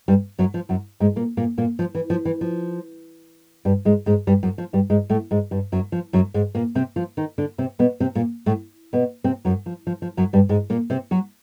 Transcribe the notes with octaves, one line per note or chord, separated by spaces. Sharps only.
G2 G3
F#2 F#3
F3
F#2 F#3
G#2 G#3
A#2 A#3
A#2 A#3
A#2 A#3
F3
E3
F3
E3
F3
G2 G3
G#2 G#3
G#2 G#3
G2 G3
F#2 F#3
F3
G2 G3
G#2 G#3
A2 A3
G#2 G#3
G2 G3
F#2 F#3
F3
F#2 F#3
G#2 G#3
A#2 A#3
C3 C4
F3 F4
D#3 D#4
D3 D4
C3 C4
B2 B3
C3 C4
A#2 A#3
A2 A3
B2 B3
C3 C4
F#2 F#3
F3
F3
F3
F#2 F#3
G2 G3
G#2 G#3
A#2 A#3
C3 C4
F#3 F#4